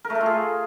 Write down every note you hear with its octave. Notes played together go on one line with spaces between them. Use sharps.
A#4
A3
A4
F4
G#4